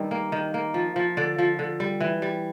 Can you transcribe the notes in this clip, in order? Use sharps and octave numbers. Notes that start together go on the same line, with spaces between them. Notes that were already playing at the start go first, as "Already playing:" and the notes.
Already playing: G2 D#3 G3
A#3
D#3
A#3
F3
F3
D3 D5
F3
D3
G3
E3
G3